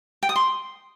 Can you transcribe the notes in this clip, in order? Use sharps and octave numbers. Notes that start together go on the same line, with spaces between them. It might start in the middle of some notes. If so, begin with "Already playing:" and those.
G5
D#6
C6